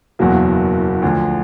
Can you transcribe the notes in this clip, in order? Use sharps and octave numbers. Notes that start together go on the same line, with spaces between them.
F#1 E2 B2 F#3 A#3
D2 D3 F3